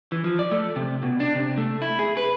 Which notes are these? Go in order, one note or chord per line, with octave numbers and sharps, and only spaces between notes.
E3
F3
D5
A3
C3
B2
D4
C3
A3
E4
G#4
B4